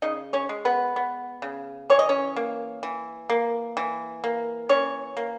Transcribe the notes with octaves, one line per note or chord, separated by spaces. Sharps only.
C#3 D#4 D#5
C#4 C#5
G#3
B3 B4
B3
C#3
E3 C#5
D#5
C#4 C#5
A#3
E3
A#3
E3
A#3
E3 C#4 C#5
A#3